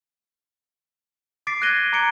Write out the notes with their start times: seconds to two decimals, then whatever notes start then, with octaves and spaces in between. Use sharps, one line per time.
1.47 D6 A6 B6 C7 D7
1.62 F#6 G#6 A#6 D#7 G7
1.93 A#5 D6 G#6 C#7 D7 G7